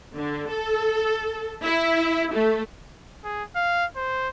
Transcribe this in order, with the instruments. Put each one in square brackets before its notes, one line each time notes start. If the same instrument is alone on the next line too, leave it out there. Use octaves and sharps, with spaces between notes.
[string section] D3
A4
E4
A3
[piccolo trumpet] G#4
F5
C5